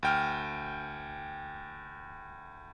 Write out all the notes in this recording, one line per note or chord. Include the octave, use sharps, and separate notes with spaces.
D2 G5 F6